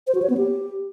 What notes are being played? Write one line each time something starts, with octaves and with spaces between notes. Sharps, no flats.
C5
F#4
C#5
B3
G4